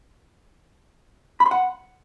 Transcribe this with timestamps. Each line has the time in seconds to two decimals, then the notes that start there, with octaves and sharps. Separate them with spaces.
1.40 B5
1.46 C6
1.51 F#5